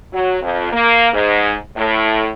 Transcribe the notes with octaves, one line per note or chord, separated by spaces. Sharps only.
F#3
F2
A#3
G#2
A2